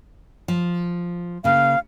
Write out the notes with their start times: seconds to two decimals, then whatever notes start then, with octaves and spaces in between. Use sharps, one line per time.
0.48 F3
1.44 C#3 A#3 F5